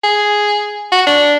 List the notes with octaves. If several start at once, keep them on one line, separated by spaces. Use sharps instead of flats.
G#4
F#4
D4